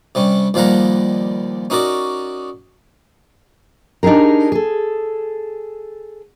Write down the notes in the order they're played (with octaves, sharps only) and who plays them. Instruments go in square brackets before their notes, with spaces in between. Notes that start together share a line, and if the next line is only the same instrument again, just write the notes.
[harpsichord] C3 G3 C#4
D#2 F3 G3 F5 F#5 A#5
C#4 D#4 F#4 A#4 D5
[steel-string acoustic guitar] D4 D#4 G4 G#4 A#4
G#4 A4